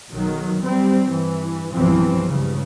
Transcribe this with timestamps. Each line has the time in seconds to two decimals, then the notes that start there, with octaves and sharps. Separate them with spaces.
0.11 B1 D#3 F#3
0.62 G3 C4
1.03 G2 E3
1.72 B1 E2 G2 E3 F3 C4
2.27 C#2 G2 C#3